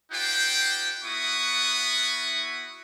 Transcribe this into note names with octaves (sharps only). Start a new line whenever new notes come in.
D#4 F4 G4 C5 F#5 G5
B3 E4 F#4 B5 C#6 D#6